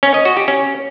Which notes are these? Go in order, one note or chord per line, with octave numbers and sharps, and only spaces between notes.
C#4
D#5
F#4
G4
C#4